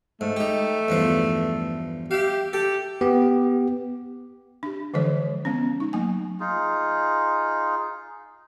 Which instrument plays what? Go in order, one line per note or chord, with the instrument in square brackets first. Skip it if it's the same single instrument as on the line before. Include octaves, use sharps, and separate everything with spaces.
[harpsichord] G#2 [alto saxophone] A3
[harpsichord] D#4 G4
E2 G2 F3
[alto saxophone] G4 [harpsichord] E5 F5
[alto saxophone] G4 [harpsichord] A4
[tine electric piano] B3 G4
[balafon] D4 G4
D3 E3 F3 G#3 A4 C#5
G#3 B3 C#4
D#4
F#3 A3 A#3 G#5
[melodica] D#4 F4 G#4